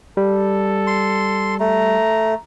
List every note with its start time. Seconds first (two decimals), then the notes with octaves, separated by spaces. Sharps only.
0.17 G3 A4
0.87 C6
1.60 A3 A#5